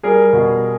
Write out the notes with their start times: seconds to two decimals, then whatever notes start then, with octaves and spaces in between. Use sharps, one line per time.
0.03 G3 G#4 A#4
0.33 B2